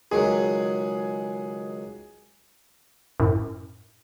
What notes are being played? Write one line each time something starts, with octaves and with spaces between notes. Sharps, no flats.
C#2 D#3 F#3 G#4
F#2 A2